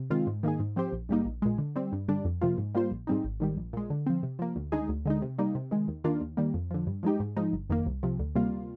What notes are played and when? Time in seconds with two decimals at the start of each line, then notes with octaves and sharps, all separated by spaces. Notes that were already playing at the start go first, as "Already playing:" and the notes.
Already playing: C3
0.10 D#3 G#3 C4 F4
0.27 G#2
0.43 D#3 A#3 D#4 G#4
0.60 G#2
0.76 F3 C4 G4 C5
0.92 A#1
1.09 G#2 G3 A#3 D#4
1.26 A#1
1.42 A#2 G#3
1.58 D3
1.76 G3 C4
1.92 G2
2.08 D3 G3 D4
2.25 F2
2.41 C3 F3 A#3 F4
2.58 G#2
2.75 G3 A#3 F4 C5
2.91 A#1
3.07 G#2 G3 C4 D#4
3.24 G#1
3.40 G#2 D#3 G3
3.57 A#1
3.73 A#2 G#3
3.90 D3
4.06 F3 C4
4.23 C3
4.39 F3 A#3
4.56 D2
4.72 D3 G#3 D#4 G#4
4.89 D2
5.05 D3 G#3 D#4
5.22 C3
5.38 G3 A#3 D#4
5.55 C3
5.71 D#3 G#3
5.88 D#2
6.04 D#3 A#3 D4 F4
6.21 D#2
6.37 D#3 G3 A#3
6.54 F2
6.71 D3 F3
6.87 G2
7.03 F3 G#3 D#4 G4
7.20 G#2
7.37 F3 G#3 D#4
7.53 G1
7.70 F2 D#3 A#3
7.86 C2
8.03 C3 F3
8.19 D2
8.35 C3 G3 A#3 F4